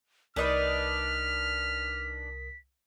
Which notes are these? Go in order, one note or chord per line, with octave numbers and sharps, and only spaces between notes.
C2 D4 D#4 A#4 B4 D#6 F6 B6